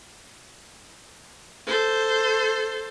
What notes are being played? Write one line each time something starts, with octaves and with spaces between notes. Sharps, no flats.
A4 C5